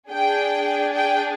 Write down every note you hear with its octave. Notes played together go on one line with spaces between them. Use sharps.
D4 G#4 G5
G5